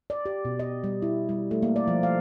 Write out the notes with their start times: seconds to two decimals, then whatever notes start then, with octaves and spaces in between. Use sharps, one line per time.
0.10 D5
0.26 G4
0.45 B2
0.59 D#5
0.84 G3
1.02 E4
1.29 G3
1.51 A3
1.62 A#3
1.76 D5
1.88 F3
2.03 F5